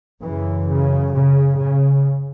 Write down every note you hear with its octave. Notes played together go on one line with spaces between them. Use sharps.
F#2 C#3 E3
C#3
C#3
C#3